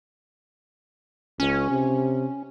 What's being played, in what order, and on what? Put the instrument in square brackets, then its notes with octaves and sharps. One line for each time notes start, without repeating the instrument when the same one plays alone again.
[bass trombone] C#2 [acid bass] C#4
[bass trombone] C3